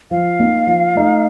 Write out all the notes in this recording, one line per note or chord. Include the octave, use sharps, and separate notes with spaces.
F3 F5
A#3 D#4
F3
A3 D#4